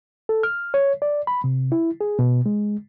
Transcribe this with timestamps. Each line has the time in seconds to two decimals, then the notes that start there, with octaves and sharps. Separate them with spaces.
0.29 A4
0.43 F6
0.74 C#5
1.02 D5
1.27 B5
1.44 C3
1.72 E4
2.01 G#4
2.19 B2
2.46 G#3